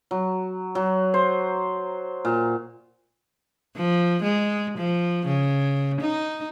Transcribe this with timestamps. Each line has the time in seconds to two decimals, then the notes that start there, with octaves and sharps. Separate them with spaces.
0.11 F#3
0.75 F#3
1.14 C5
2.25 A#2
3.76 F3
4.23 G#3
4.78 F3
5.26 C#3
6.01 D#4